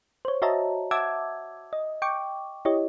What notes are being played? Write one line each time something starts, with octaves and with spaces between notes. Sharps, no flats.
C5 C#5
F#4 C#5 D#5 E5 A5 A#5
E5 F#5 A5 D6 E6 G#6
D#5
G5 C#6 D6
E4 G4 C#5 D#5